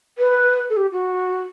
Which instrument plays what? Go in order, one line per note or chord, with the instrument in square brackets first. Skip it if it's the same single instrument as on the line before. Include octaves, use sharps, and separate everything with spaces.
[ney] B4
A4
G4
F#4